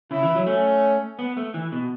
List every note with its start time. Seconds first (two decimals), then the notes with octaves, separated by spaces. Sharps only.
0.11 C#3 E4
0.23 E3
0.35 F#3
0.46 A3 C#4
1.19 B3
1.37 A3
1.54 E3
1.72 B2